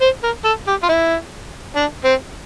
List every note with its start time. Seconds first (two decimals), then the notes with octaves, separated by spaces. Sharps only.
0.01 C5
0.23 A#4
0.45 A4
0.67 G4
0.83 F4
0.89 E4
1.76 D4
2.04 C4